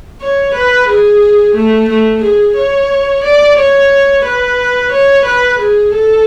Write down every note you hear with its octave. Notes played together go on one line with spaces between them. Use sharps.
C#5
B4
G#4
A3
A3
G#4
C#5
D5
C#5
B4
C#5
B4
G#4
A4